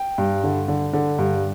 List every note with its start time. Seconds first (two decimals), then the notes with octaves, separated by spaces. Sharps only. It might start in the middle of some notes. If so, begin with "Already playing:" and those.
Already playing: G5
0.18 G2
0.44 D3
0.68 D3
0.93 D3
1.18 G2